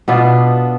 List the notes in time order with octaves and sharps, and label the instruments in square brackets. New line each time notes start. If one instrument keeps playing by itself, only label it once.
[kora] B2 B3 D4 F4 E5